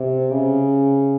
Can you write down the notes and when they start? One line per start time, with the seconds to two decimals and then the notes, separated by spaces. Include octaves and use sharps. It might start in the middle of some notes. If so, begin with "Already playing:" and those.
Already playing: C3
0.32 C#3